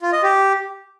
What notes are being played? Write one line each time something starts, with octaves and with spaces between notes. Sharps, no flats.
F4
D#5
G4